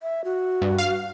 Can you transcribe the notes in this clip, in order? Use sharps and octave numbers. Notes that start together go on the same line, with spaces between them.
E5
F#4
G2
F5